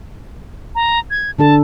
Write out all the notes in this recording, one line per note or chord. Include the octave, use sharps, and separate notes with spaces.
A#5
G#6
D3 D4 A4 A5